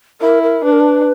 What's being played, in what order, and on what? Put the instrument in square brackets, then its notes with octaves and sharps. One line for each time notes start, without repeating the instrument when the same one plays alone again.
[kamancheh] E4 [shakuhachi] A#4
[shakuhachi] A#4
[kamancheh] D4 [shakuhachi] B4
[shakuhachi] A#4
B4